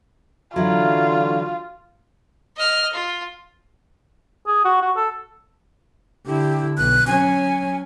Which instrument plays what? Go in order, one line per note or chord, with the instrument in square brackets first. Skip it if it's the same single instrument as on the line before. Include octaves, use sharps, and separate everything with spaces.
[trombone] D3 [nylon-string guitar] E3 F#3 [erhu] F4
[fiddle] D#5 F6
F4
[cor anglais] G#4
F#4
F#4
A4
[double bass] D3 E4 [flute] G4
[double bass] B1 [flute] F#6
[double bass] F#3 C#4 [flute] G#5